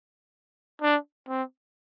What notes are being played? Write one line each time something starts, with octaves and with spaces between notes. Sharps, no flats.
D4
C4